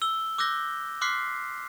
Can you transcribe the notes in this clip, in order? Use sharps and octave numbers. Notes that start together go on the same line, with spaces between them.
E6 G7
D6 E6 F#6 G6 A#6 G7
C6 D6 F6 F#6 B6 C7